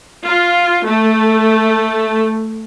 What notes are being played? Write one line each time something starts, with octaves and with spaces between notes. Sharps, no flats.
F4
A3